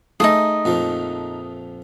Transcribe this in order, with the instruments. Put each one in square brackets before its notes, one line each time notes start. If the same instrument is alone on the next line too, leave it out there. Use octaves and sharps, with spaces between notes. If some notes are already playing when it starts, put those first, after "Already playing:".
[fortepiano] A3 [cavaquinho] D#4 F4 [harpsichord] G#4 E5 [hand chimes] D#6
[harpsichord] A#1 F2 F3